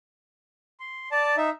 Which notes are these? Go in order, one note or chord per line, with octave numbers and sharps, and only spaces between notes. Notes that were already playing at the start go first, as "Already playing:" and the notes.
C6
D5 A5
D#4 E5